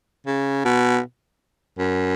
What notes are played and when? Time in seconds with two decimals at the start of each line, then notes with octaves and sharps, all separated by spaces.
0.27 C#3
0.65 B2
1.79 F#2